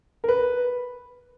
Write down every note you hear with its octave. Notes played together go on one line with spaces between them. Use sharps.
A#4
B4